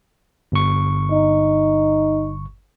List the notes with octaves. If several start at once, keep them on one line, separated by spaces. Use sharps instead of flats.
G1 C#6
D#4